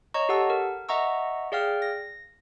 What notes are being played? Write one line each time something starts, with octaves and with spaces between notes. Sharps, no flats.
C#5 D#5 A#5 C#6
G4 A4 F#5 A5 E6
A#4
D#5 E5 F#5 A#5 C#6 E6
G#4 D5 F5 G5 F6
A#6